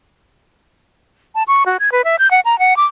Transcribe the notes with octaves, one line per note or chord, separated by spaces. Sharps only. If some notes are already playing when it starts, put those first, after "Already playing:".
A5
C#6
F#4
G#6
B4
E5
G6
F#5
A#5
F#5
D6